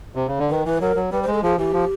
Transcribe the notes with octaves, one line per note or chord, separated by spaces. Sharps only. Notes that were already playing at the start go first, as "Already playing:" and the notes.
C3
C#3
D3
D#3 B4
E3 B4
F#3 A#4
F#3
G3 B4
G#3 C5
A4
F3 G#4
E3 G4
F3